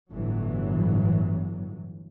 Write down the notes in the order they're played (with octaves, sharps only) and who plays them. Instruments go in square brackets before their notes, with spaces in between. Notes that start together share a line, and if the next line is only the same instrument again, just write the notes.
[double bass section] G1 A2 E3 F#3